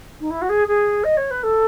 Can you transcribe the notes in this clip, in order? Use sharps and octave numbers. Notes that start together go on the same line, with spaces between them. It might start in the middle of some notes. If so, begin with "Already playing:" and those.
D#4
E4
F#4
G#4
G#4
D#5
C#5
B4
A4